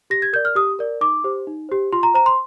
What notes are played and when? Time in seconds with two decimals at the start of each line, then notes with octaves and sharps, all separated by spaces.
0.10 G4 A#6
0.22 G#6
0.33 A#4 D5 G6
0.45 F6
0.55 G4 D#6
0.79 A#4 D5
1.01 D#4 D6
1.24 G4 C5
1.47 D#4
1.69 G4 C5
1.93 F4 C6
2.03 A#5
2.14 C5 A#5
2.26 C6